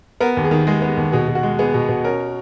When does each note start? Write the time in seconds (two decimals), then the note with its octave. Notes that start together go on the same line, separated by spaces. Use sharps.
0.20 B3 A#4
0.37 D#2
0.44 G#4
0.51 D#3
0.67 G#3 G#4
0.82 B3
0.97 D#2
1.12 B2 G#4
1.28 B2
1.35 F#4
1.43 G#3
1.59 B3 G#4
1.74 B2
1.89 B2
2.04 C#4 A#4